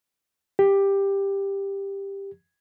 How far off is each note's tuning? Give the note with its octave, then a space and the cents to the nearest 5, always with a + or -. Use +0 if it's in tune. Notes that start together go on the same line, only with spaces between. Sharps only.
G4 +10